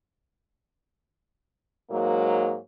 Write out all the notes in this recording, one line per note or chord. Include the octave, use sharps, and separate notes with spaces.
G#2 F#3 A#3